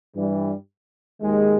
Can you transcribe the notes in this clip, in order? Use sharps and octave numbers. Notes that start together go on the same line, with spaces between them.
G2 E3 G3
D#2 D#3 G#3